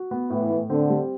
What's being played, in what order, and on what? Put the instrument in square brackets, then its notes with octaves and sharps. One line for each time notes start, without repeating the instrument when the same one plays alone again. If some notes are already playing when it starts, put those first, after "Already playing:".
Already playing: [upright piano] F#4
B3
[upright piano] A2 [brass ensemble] E3
[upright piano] A2
[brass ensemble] D3 [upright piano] C4
[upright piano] G3